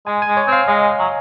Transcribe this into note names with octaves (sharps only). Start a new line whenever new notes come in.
G#3 G#5
G#5
G#3
C#5
C4
F5
G#3 D#5
F#3